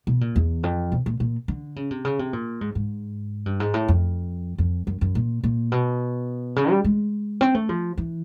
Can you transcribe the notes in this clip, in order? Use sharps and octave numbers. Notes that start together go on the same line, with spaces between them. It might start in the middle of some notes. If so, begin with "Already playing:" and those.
B2
A#2
E2
F2
B2
A#2
A#2
D3
C#3
C3
C#3
C3
A#2
G#2
G#2
G2
G#2
A2
F2
F2
F#2
F#2
A#2
A#2
B2
C#3
G3
G#3
C4
A3
F3
E3